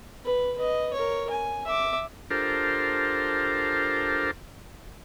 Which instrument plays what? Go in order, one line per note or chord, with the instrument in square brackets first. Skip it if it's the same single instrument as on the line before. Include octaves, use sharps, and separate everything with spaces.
[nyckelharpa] B4
B4 D#5
A#4 C#5
G#5
E5 D6
[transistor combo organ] D4 F4 G4 A4 A#4 C5